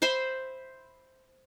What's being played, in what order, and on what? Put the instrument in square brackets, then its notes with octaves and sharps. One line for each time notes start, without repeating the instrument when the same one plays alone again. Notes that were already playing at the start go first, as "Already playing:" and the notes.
[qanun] C5 E5 B5 C6